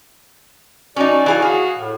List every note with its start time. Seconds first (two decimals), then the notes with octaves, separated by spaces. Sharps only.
0.96 F#3 C#4 D#4 F#4 D5
1.26 E3 G#4 F5
1.42 F#4 G#4 F5
1.79 A2